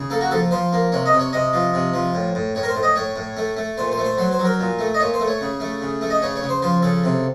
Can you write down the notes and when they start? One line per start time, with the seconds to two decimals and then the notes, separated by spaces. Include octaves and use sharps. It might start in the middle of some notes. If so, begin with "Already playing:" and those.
Already playing: C#3
0.10 A#3 A4
0.21 F#4
0.31 F3 A4
0.51 F3 C5
0.73 A#3
0.92 C3 C#5
1.06 D#5
1.13 C3
1.20 C#5
1.33 C3 D#5
1.53 F3
1.74 C3
1.94 F3
2.14 A2
2.35 A2
2.55 A2 C#5
2.63 A#4
2.69 C5
2.75 A2
2.83 D#5
2.96 A2 C#5
3.16 A2
3.37 A3
3.57 A3
3.78 A#2 C5
3.92 C5
3.97 A3
4.04 C5
4.18 F#3 C5
4.31 C5
4.39 F#3
4.45 A#4
4.60 A#2
4.79 A3
4.94 D#5
5.00 A#2 C#5
5.14 C5
5.20 A3
5.27 C#5
5.41 C#3
5.60 A3
5.82 C#3
6.01 A3
6.10 D#5
6.22 C#3 C#5
6.36 C#5
6.43 C#3
6.49 C5
6.62 F3 C5
6.82 C#3 A4
7.04 C3